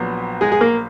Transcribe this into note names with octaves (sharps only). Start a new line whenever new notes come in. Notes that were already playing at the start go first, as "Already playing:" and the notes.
Already playing: A#1 A#2 F#3 B3
G#3 G#4
G#4
A#3 A#4